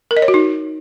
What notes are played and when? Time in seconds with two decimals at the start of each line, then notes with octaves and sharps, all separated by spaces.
0.11 A#4
0.17 D#5
0.22 C#5
0.28 F#4
0.34 D#4